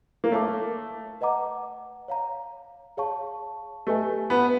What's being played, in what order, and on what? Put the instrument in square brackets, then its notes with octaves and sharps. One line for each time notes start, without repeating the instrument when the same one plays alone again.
[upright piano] A#3
[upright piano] A3 [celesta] C#5 F5 A5 D6
[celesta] B4 D#5 F#5 A#5 D6
C#5 F5 A#5
G#4 C#5 F5 A5 C#6
[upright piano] A3 [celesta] G4 B4 D#5 G#5
[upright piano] B3